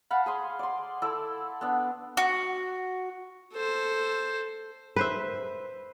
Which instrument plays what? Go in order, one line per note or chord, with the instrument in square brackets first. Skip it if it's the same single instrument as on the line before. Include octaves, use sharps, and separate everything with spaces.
[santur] F5 F#5 A5 B5
G#4 G#5 C6
D5 C6
E4 A4 D5 E6
B3 D4
[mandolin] F#4
[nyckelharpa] A4 C5
[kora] B4 C5 E5